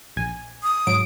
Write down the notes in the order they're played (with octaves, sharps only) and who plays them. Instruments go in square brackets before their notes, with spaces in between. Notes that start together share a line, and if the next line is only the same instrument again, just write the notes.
[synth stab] A#1 G#5
[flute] D#6
[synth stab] G#2 F#3 D7